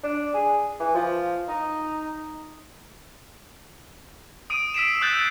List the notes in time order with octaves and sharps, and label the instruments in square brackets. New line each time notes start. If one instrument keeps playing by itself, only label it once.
[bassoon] D4
G#4
E3
F3
D#4
[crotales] D#6 D7 D#7
E6 B6 C7 D7 E7
D#6 E6 F#6 G6 A6